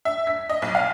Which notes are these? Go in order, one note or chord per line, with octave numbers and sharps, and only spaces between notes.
E5
B6
D#5
B1
F5